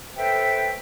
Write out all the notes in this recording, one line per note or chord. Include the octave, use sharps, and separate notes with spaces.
A4 B4 C5 E5 G5